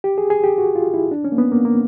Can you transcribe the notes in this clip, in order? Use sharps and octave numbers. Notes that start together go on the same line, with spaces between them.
G4
G#4
G#4
G4
F#4
F4
E4
D4
C#4
A#3
B3
A#3
A#3